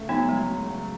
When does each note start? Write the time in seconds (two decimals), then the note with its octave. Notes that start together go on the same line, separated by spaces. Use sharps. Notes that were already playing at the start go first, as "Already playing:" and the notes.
Already playing: C#2 A3
0.09 F#3 B3 D#4
0.29 F#3 G#3
0.49 C#3
0.69 F#3